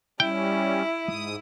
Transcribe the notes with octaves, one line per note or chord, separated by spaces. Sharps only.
G3 C#4 E4 G5
G#2 D#6